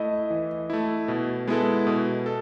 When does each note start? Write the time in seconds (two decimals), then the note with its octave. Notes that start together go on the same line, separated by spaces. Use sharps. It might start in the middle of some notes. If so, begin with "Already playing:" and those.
Already playing: A3 E4 D#5
0.30 E3
0.70 A3 E4
1.08 B2
1.47 G#3 B3 E4 A4
1.87 B2
2.26 A4